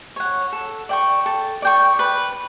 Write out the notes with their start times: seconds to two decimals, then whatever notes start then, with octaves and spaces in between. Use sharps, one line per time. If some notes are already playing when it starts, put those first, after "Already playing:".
0.16 C#5 F#5
0.53 A4
0.89 D5 G5 C#6
1.26 A4
1.62 D5 G5 C#6
1.99 B4